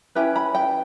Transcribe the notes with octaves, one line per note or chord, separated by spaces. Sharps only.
C#4 E4 G4 B4 G5
B5
G5